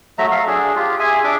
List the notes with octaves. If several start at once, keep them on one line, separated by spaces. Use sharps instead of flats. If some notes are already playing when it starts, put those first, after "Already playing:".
F#3 A3 E5 A#5
A4 F5
D4 G#4
F4 G4
G#4 E5 G#5
D4 E5 D6